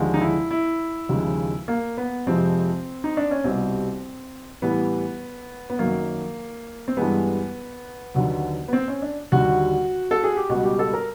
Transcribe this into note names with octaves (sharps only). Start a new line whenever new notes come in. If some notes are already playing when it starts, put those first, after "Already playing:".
Already playing: D#2 D3 F3 G#3
D#4
E4
E4
D#2 C#3 F3 G#3
A#3
B3
F2 C3 F3 G#3 C4
D#4
D4
C#4
C2 B2 G3 C4
A2 E3 G3 B3
B3
F#2 D#3 F#3 A#3
C4
G2 E3 G#3 B3
D#2 D3 F#3
B3
C4
C#4
D4
D#2 D3 G3 F#4
A4
G#4
G4
C#2 B2 G3 F#4
G4
A4
A#4